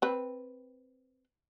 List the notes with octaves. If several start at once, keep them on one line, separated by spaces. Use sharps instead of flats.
C4 B4